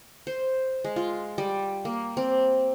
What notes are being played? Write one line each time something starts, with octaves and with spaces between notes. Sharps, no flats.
C5
G#3
F4
G3
A#3
C4